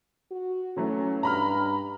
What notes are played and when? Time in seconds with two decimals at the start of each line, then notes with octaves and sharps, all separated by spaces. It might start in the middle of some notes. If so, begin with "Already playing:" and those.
0.31 F#4
0.77 E3 F#3 A3 C#4
1.23 G2 A#5 B5 F6